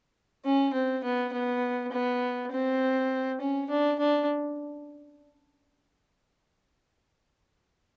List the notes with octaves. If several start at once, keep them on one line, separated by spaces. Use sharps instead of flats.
C#4
C4
B3
B3
B3
C4
C#4
D4
D4